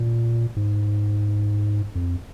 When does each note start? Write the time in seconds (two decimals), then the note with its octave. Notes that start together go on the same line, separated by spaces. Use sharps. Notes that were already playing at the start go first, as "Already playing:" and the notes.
Already playing: A#2
0.56 G#2
1.95 F2